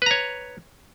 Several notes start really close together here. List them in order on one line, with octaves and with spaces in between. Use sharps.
B4 A#5 C#5